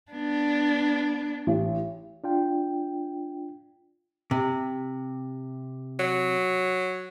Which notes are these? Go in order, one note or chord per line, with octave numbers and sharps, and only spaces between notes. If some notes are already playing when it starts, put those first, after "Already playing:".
B3 D4
A1
D4 F4 G5
C3
F#3